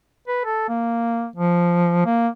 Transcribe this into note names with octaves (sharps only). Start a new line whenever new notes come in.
B4
A4
A#3
F3
A#3